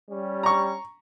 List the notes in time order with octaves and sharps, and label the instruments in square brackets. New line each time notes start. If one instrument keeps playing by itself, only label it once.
[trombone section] G3 C#4 G4
[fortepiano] A#5 C#6